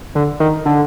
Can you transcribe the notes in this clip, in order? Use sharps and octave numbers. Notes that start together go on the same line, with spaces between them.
D3
D#3
D3